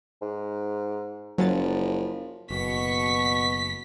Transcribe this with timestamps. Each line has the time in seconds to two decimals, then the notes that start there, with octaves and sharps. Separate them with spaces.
0.22 G#2
1.38 F#1 F3 F#3 C#4 A6
2.50 F#1 B2 C#6 B6